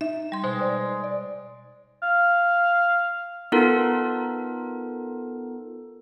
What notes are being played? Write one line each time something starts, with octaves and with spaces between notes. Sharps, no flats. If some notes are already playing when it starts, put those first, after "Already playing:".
D#4 E5
G3 C6
B2 G#3 C5
C5 D5
D5
F5
B3 D#4 F4 A4 A#4